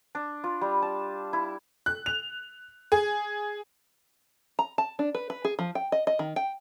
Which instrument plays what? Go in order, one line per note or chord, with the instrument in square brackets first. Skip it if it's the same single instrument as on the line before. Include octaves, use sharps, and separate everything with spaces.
[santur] D4
F4
G3
A5
E4
[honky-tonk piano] F#6
F7
G#4
[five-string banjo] A#5
A5
D4
B4
B4
G#4
F3
G5
D#5
D#5
D#3
G5